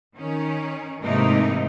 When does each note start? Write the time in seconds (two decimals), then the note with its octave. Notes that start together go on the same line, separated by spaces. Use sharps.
0.15 D#3 C#4
1.01 G#2 C3 E3 A3 A#3 D#4